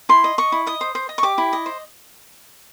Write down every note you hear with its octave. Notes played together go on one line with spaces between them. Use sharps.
E4 C6
D#5
D#5 C#6
E4
D#5 D#6
C5
C5
D#5
C#6
G4 D6
E4
D#5
C5